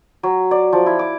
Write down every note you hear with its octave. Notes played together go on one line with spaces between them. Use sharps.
F#3
D5
F3
E4
D6